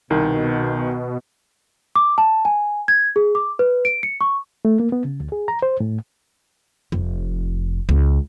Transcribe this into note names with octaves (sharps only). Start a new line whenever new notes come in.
C2 B2 D#3
D6
A5
G#5
G#6
G#4
D6
B4
D7
C#7
C#6
A3
A#3
B3
C#3
D2
G#4
A#5
C5
A2
F1
C#2